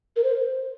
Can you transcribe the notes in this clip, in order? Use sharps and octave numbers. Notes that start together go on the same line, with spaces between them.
A#4
C5